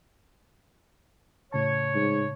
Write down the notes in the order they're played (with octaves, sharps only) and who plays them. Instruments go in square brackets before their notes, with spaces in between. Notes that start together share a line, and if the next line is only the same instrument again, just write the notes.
[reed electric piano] A2 C#3 A5 [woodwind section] C#5
[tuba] G#2